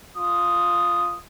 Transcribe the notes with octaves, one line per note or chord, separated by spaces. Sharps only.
F4 D#6